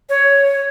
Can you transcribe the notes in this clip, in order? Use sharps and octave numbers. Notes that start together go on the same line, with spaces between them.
C#5